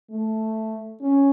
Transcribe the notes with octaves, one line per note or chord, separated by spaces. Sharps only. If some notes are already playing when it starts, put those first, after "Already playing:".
A3
C#4